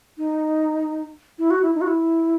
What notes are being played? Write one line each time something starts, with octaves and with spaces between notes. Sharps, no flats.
D#4
E4
F#4
E4
D#4
F#4
E4